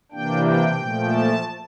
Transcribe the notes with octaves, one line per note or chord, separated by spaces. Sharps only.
C3 E3 A#3 D4 G5
G5
A#2 F3 A3
A5